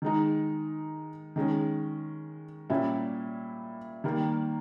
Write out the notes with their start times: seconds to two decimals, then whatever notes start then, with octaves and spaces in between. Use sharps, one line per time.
0.02 D#3 G#3 D#4
1.36 D#3 G#3 C#4
2.70 A#2 G3 C#4 E4
4.04 D#3 G3 A#3